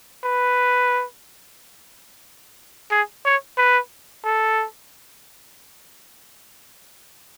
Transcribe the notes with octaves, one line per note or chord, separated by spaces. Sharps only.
B4
G#4
C#5
B4
A4